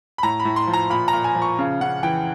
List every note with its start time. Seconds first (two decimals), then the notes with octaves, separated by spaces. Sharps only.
0.18 B5
0.23 A2 A#5
0.40 B5
0.45 A2
0.56 C6
0.67 F3
0.74 A#5
0.90 A#2 B5
1.08 A#5
1.13 A#2
1.24 G#5
1.35 F3
1.42 C#6
1.59 C#3
1.81 C#3 F#5
2.03 E3 G5